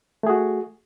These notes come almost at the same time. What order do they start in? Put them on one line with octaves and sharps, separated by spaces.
A3 G#4 F#4